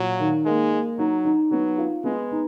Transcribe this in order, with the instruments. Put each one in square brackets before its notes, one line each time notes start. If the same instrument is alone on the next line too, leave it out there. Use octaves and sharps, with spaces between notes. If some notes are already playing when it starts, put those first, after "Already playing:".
Already playing: [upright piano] A#2 [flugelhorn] F#3
[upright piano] D#3
[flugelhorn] G#3 [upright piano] A#3
[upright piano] A#3
[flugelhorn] F#3 [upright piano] D#4
[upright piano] D#4
[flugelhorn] F#3 [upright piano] B3
[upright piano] F4
[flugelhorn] G#3 [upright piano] B3
[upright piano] D#4